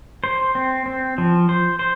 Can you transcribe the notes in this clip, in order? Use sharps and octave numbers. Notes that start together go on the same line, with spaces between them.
C5
C4
C4
F3
C5
C5